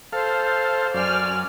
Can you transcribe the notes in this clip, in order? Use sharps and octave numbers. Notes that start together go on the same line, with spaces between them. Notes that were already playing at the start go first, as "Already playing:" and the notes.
A4 C5 F5
F#2 D5 G#5 F6